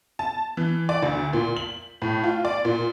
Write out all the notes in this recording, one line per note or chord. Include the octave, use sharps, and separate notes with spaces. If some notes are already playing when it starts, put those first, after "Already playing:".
A5
E3
D5
D2
A#2
F#7
A2
F4
D5
A#2